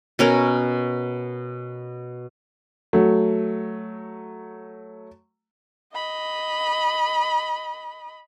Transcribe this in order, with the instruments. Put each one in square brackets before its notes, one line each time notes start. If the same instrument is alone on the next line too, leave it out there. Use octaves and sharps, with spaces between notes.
[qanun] B2 C#4 A#4
[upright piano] F#3 A3
[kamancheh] D#5 B5